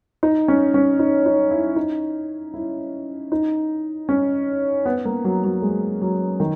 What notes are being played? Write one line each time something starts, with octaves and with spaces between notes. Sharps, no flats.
D#4
C#4
C#4
D#4
D#4
E4
D#4
E4
D#4
C#4
B3
A#3
F#3
F#3
G#3
F#3
D#3